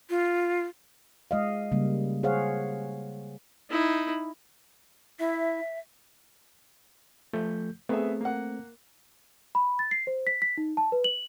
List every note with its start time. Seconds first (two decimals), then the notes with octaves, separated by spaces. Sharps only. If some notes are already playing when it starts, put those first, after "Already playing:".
0.10 F4
1.31 G#3 D#5 F5
1.72 C#3 G3 A#3
2.23 G#4 C5 C#5 F5 F#5
3.70 D#4 E4
5.19 E4 E5
7.33 F3 A3 G6
7.89 A3 B3 C4 G#4 E5
8.21 A#3 F#5
9.55 B5
9.79 A6
9.91 C7
10.07 C5
10.27 B6
10.42 B6
10.58 D#4
10.77 A5
10.92 B4
11.04 F#7